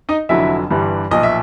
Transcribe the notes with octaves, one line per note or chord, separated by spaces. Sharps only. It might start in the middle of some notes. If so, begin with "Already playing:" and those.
D#4 D#5
F1 F2 D3 F#3 E4 E5
G1 G2 E3 G3
B1 A#2 F3 D#5
E5